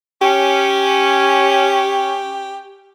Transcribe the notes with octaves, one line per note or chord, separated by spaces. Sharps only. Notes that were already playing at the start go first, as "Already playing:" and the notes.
C#4 G4